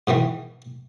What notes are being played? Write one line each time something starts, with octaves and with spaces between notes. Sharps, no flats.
G#2 B2 D#3 E3